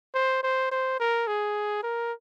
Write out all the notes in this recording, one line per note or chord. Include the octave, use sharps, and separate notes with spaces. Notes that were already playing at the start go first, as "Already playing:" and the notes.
C5
C5
C5
A#4
G#4
A#4